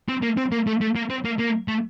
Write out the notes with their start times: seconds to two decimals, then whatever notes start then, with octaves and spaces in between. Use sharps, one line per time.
0.08 C4
0.23 A#3
0.37 C4
0.52 A#3
0.67 A3
0.81 A3
0.95 A#3
1.10 C4
1.25 A#3
1.39 A#3
1.68 A3